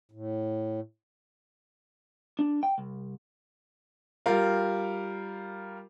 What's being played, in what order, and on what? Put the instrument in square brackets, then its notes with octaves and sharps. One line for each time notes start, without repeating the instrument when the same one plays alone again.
[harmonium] A2
[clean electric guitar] D4
G5
C2
[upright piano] G3 F4 A#4 F5